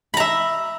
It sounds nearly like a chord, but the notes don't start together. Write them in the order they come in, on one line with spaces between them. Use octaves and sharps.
B5 A#5 E5